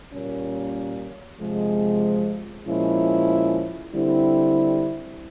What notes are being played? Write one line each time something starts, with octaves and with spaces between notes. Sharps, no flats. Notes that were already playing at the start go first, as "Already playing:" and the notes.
A#2 G3 A#3 C#4
C3 F3 G#3
A#2 F3 G#3 C#4 E4
D3 G3 C4 E4